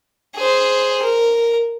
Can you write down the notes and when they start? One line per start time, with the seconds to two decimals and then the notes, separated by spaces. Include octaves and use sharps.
0.36 G#4 C5
1.02 A#4